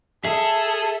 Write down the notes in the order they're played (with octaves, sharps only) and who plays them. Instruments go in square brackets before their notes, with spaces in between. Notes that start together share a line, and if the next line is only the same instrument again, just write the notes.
[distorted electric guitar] G#4 [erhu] A4 [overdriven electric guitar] E5